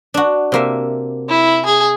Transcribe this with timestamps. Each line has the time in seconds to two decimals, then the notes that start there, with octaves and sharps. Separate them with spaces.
0.14 D4 F#4
0.52 C3 A#3 E5
1.29 E4
1.65 G#4